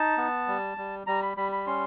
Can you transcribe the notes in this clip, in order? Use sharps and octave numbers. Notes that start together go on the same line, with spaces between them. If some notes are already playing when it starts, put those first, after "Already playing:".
Already playing: D#4 A5
B3
G3
G3
G3 A#5
B5
G3 B5
B5
C#4 C6